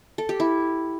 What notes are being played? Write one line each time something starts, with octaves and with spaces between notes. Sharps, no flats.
A4
G4
E4